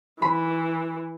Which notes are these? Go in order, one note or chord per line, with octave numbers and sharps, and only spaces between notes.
E3 B5